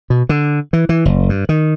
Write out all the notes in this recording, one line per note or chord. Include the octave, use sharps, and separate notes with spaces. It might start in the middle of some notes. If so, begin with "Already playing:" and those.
B2
D3
E3
E3
F#1
G2
D#3